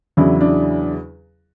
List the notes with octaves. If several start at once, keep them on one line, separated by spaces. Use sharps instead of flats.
E2 C#3 F#3 D4 E4
D4 E4